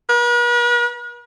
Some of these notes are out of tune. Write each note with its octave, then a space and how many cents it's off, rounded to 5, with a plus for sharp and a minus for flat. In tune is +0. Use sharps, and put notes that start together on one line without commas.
B4 -45